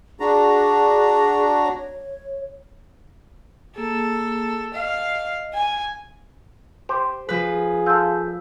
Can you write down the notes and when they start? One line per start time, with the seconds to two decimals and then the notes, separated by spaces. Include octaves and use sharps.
0.20 D4 F#4 G#4 A#5
1.65 C#5
3.76 A#3 G#4 A4
4.74 D#5 F5
5.54 G#5
6.89 G4 C5
7.29 F3 G#4 B4
7.86 F4 A4 E6 G6